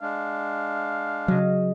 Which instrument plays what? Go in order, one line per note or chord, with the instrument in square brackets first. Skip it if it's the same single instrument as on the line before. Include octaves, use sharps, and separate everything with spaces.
[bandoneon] G#3 D4 [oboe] F5
[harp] C#3 D#5 [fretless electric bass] F#3